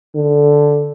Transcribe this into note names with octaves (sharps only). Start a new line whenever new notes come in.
D3